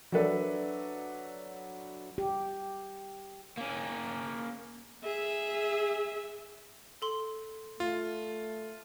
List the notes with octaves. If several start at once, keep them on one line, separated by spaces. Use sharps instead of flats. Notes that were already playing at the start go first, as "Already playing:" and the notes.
F#3 D4 A4 B4 D5 E5
G4
A#3 C#4
G#4 E5
A4 C6
A3 F4